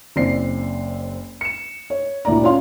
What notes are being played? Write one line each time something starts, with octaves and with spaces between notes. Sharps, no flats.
F#1 C4 D5 C7
C#7 E7
C#5
D2 A#2 E4 D5 A#5
C#4 F4 D5 F5 C6